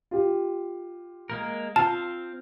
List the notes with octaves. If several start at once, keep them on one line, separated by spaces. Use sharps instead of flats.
F4 G4
G#3 A#3 A#4
C4 F4 F5 A5